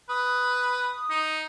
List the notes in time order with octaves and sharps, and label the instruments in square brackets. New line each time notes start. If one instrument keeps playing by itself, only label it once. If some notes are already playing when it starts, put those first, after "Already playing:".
[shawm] B4 [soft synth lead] D#6
[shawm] D#4